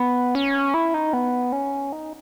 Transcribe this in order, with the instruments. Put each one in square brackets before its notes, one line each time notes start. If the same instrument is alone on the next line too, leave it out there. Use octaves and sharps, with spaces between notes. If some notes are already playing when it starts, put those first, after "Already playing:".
Already playing: [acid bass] B3
C#4
E4
D#4
B3
C#4
D#4